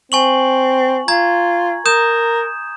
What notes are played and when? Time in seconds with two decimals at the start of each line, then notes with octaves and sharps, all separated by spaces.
0.12 C4 G#5 C#6 F#7
1.08 F4 A#5 G#6
1.86 A#4 D#6 G6 E7